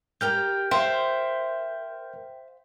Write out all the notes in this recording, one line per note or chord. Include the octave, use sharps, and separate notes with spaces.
G4 A#4 G5 A#5 F6 G6
C5 E5 F5 G5